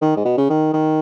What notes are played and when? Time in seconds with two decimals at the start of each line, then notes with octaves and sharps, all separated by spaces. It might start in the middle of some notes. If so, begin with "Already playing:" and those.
0.02 D#3
0.17 G#2
0.25 B2
0.38 C#3
0.50 D#3
0.73 D#3